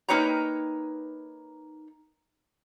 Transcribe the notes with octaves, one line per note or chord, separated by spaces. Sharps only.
A#3 D#4 B4 C#5 G5 A#5